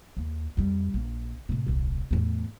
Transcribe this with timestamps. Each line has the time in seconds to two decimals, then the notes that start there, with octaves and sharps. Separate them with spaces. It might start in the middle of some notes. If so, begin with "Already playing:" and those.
0.17 D#2
0.57 F2 G3
0.94 A#1
1.49 A2 C3
1.67 D#1 C2
2.11 E2 A2